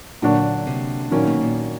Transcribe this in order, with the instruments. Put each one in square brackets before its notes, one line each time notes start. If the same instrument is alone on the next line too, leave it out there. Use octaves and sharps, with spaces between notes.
[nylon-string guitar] A#2 [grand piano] D3 F#3 A#3 D4 F#4
[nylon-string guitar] C3
[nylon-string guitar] A#2 [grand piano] D#3 F#3 A#3 C#4
[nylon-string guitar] B2
A#2